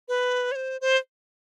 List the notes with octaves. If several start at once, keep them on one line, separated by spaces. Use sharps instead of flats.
B4
C#5
C5
C5